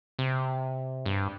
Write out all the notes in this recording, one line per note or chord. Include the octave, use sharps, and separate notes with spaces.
C3
G2